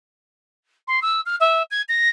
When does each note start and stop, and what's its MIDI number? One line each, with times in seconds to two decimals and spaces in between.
0.88 1.00 84
1.02 1.21 88
1.26 1.36 89
1.40 1.63 76
1.71 1.82 92
1.89 2.09 94